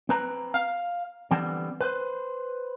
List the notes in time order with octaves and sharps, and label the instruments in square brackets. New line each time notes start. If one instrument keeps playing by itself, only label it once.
[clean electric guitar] C4 B4 A#5
F5
D3 E3 G3 B3 C4
B4 C5